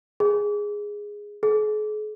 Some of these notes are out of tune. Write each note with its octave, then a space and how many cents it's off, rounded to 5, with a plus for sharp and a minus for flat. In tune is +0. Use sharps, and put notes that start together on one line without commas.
G#4 -5
G#4 +40